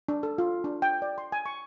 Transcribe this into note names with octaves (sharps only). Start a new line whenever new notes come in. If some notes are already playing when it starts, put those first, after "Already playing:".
D4
A4
F4
D4
G5
D5
C6
G#5
C#6